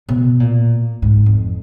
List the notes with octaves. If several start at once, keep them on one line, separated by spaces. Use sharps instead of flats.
B2
A#2
G#2
F2